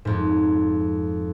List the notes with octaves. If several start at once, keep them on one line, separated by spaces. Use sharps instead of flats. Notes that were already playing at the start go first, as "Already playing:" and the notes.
F2 G#2